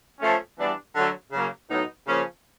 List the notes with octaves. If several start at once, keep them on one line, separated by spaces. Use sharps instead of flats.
F3 A3 C#4
E3 G3 B3 D4
D3 F#3 A3
C#3 F#3 A#3
A2 F#3 B3 D#4
C#3 F3 A#3 C#4